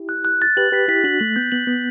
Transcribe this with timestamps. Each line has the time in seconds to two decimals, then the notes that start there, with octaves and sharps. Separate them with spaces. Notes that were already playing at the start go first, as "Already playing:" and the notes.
Already playing: E4 G4
0.09 F#6
0.25 F#6
0.42 A6
0.57 G4 B4 F#7
0.72 G4 B4 B6
0.88 E4 G4 B6
1.04 D4 F#4 F#7
1.20 A3 F#7
1.36 B3 G6
1.52 B3 F#7
1.67 B3 B6